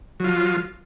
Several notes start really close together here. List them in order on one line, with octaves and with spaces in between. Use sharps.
F#3 F4 F3